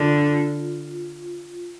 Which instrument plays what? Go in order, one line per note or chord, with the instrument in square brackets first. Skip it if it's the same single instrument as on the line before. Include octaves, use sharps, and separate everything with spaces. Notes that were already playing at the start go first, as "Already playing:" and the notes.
Already playing: [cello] D3 [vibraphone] F4